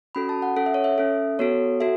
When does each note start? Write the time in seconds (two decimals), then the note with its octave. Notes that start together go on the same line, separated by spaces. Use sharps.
0.15 C#4 F#4 A4 B5
0.29 A5
0.42 F#5
0.56 C#4 A4 F#5
0.66 E5
0.74 C#5
0.84 E5
0.98 C#4 A4
1.39 B3 F#4 A4 C#5
1.80 F#4 A4 E5